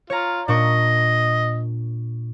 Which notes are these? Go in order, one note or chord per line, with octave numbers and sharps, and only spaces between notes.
F4 C#5 A#5
A#2 D4 D#5 C#6